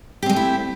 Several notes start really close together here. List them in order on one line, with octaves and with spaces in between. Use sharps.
G4 C4 G#3 A3 E4